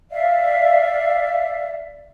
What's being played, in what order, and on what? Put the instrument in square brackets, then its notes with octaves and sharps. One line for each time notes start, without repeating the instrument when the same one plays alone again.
[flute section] D5 E5 F5